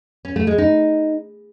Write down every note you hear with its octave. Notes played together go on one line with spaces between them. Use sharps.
C#4
A3
G#3
D#4